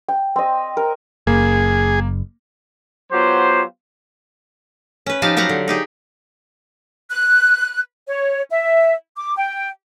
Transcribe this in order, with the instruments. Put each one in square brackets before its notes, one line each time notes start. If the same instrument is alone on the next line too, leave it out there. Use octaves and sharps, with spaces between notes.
[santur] G5
C4 D#5
A#4
[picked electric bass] F#1 [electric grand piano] A#3 [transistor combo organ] G#4
[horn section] F#3 B3 F4 G4 C5
[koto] C#4 B4
F3 D#4 G4 F5 A5
F#3 G4 F5 F#5 A#5
D3
D#4 G4 G#4
[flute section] F#6
C#5
E5
D6
G5